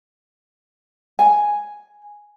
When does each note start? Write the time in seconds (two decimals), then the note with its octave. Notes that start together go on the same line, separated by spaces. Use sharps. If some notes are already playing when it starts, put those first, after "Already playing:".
1.19 G#5